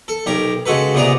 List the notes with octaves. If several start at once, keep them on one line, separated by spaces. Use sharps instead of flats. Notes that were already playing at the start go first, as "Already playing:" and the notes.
A4
B1 G4 A#4
C#3 G#3 F#4 A4 B4
C2 A#2 B3 G#4 D5 A#5